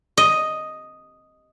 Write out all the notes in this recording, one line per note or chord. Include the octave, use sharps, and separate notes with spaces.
D#5